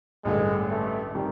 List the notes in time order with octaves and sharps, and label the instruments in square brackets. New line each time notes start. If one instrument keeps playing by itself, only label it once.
[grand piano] A1 G2 D3 [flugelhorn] G#3
[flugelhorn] A3
[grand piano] D#3 G3 C4